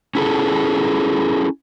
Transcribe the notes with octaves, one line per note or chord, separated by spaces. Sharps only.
C#4 E4 G#4 A4